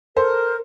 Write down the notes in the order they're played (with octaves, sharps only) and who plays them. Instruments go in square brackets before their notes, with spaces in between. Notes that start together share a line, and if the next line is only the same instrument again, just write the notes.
[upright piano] A4 C5 [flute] A#4